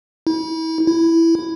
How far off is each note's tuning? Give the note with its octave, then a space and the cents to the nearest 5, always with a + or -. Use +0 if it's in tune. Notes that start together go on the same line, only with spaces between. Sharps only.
E4 -35
E4 +5